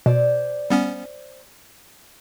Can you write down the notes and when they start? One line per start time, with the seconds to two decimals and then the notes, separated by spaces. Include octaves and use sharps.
0.06 B2 C5 D5 G#5
0.70 G3 B3 C#4